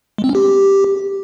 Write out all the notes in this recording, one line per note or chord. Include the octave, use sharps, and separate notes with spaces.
G#3
C4
C#4
G4